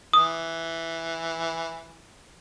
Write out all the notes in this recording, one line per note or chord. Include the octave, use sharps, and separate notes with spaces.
E3 D#6